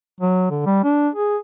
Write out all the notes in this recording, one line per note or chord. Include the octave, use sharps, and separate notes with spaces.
F#3
D3
G3
D4
G#4